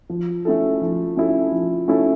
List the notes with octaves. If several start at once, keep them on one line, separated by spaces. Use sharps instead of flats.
F3
A3 C#4 E4 A4
F3
A3 C#4 E4 A4
F3
A3 C#4 E4 A4